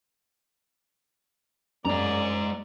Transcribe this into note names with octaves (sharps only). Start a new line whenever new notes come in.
F#2 G#3 D5 A#5